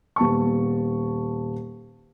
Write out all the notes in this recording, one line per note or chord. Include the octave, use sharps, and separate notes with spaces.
D#1 B3 A5 C#6